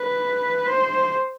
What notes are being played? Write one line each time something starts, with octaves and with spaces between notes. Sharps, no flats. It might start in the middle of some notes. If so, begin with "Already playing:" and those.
Already playing: B4
C5